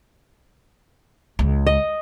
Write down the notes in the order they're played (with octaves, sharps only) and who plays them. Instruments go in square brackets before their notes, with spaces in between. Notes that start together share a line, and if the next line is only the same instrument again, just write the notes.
[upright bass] C#2
[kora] D#5